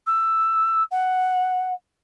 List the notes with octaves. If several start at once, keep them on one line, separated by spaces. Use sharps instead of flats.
E6
F#5